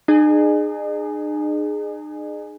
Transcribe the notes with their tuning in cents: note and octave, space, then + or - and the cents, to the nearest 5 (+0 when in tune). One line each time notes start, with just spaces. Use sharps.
D#4 -45 G#4 +0